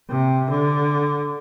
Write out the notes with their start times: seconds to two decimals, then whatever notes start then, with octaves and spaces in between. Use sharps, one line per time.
0.10 C3
0.50 D3